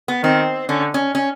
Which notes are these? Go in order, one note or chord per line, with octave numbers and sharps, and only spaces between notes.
B3
D#3 C4
D3 C#4
C#4
C#4